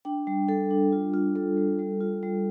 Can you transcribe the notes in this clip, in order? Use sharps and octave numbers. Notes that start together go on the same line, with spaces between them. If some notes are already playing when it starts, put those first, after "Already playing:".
D4 G5
G3
G3 A4
D4
F4
F4
G3 A4
G3
G3
F4
G3